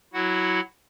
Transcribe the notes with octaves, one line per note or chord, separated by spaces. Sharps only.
F#3 E4 F#4 F#5